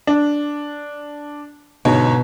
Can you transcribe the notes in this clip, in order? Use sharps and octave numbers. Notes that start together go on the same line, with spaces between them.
D4
G1 G#2 B2 C#5